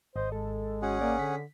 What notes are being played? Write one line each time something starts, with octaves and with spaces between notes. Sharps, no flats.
G#1 C5 D#5
G#3 A4
C#4 F#4 G#4 F#5
A#3 D5
D3 B6